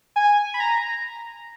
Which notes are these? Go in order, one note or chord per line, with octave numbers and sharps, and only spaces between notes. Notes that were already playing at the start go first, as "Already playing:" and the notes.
G#5
B5
A#5